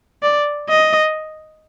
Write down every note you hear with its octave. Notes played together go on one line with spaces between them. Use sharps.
D5
D#5